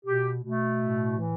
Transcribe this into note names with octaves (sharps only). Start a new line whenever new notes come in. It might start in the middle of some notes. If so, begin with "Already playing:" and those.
B2 G4
B2 A3
A2
E3